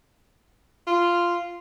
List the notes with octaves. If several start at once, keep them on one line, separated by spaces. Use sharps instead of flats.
F4